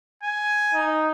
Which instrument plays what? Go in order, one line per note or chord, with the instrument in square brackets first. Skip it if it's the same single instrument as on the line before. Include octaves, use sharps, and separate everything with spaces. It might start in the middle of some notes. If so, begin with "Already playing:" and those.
[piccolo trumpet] G#5
[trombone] D#4